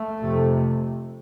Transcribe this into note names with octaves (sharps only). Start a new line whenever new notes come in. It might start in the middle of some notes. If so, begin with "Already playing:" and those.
Already playing: A3
F2 C3